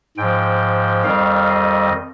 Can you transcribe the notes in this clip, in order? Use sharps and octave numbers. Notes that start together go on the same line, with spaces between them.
G#2 F3 G5
F2 D#3 G3 F5
D#5